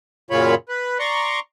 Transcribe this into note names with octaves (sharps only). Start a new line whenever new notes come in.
F#2 A#2 C#3 F4 C#5 B5
B4
D5 A#5 C6 C#6